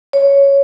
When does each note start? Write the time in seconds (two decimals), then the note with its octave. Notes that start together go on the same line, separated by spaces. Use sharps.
0.13 C#5